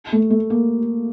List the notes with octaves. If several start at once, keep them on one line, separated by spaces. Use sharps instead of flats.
A3
A3
A#3